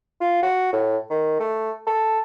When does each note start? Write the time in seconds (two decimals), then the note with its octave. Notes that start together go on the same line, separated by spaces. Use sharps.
0.21 F4
0.43 F#4
0.73 A2
1.10 D#3
1.40 A3
1.87 A4